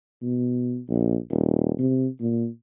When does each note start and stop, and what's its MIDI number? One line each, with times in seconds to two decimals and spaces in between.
0.22 0.80 47
0.89 1.16 34
1.31 1.72 27
1.79 2.07 48
2.20 2.47 46